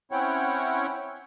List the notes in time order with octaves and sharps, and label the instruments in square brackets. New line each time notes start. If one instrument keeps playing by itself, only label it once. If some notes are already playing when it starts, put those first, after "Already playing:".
[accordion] C4 C#4 E4 C#5 F#5 G5